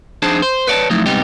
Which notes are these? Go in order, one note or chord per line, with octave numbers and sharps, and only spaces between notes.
F2 D4 D#4 G#4 C5 A5
C5
B4 C#5 D5 F#5 A5
F3 F#3 A3 D#4 E4
G#2 C3 G3 B3 D#4 G4